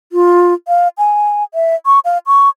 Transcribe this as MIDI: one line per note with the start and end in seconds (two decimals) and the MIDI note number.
0.12 0.54 65
0.68 0.88 77
0.98 1.44 80
1.54 1.75 76
1.86 1.99 85
2.05 2.18 77
2.27 2.49 85